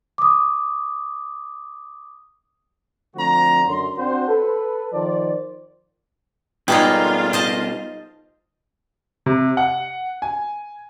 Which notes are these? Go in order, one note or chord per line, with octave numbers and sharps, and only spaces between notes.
D6 D#6
D3 F3 A3 C4 F#4 A#5
F#2 D3 C6
C4 D4 F#4 C5
A4 B4
D#3 F3 C5 D5
B2 G3 G#3 A#3 D#4 F4 B4 G5
C5 D#5 A5
C3
F#5
G#5